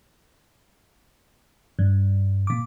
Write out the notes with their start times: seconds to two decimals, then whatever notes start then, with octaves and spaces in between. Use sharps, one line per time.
1.79 G2
2.47 A#2 D6